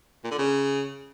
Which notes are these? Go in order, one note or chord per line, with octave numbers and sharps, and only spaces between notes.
A#2
D3
C#3